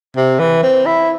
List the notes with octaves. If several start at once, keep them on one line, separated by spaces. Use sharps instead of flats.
C3
E3
C4
E4